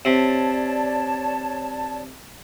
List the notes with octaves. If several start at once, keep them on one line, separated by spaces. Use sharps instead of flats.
C3 C#5 D5 A5